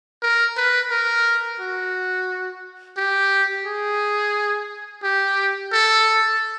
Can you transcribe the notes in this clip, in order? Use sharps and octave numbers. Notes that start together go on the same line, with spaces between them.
A#4
B4
A#4
F#4
G4
G#4
G4
A4